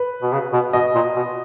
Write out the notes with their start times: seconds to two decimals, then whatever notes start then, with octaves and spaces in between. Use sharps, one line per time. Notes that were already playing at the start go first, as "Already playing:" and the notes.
Already playing: B4
0.22 B2
0.32 C#3
0.53 B2
0.73 B2 D#5
0.95 A#2
1.16 B2